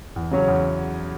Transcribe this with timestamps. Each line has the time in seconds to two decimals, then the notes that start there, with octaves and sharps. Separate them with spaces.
0.16 E2
0.31 C#3 F#3 C#4
0.48 E2